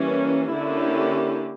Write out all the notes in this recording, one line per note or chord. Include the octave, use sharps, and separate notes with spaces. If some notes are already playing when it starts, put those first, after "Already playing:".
Already playing: E3 G3 A#3 C#4
D3 A#3 C#4 E4 G4